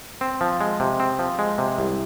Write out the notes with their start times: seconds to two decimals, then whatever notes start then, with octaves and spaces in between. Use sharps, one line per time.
0.21 C4
0.41 F3
0.61 G#3
0.80 C3
1.00 C4
1.19 F3
1.39 G#3
1.58 C3
1.78 C2